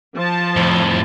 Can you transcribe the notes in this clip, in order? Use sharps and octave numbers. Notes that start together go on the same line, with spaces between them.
F3 C5 A5
F2 A2